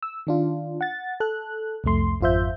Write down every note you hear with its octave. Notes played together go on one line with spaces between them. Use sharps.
E6
D#3 D4 F4
F#5 A6
A4 F#6
C2 F2 A3 C6
G#1 F2 F4 C5 E5 G6